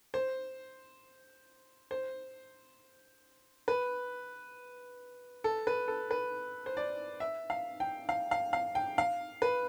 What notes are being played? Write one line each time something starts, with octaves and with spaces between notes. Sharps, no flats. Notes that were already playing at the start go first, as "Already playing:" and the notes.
C5
C5
B4
A4
B4
A4
B4
C5
D5
E5
F5
G5
F5
F5
F5
G5
F5
B4